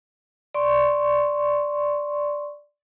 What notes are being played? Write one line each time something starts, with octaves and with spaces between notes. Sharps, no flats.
D5 C6 C#6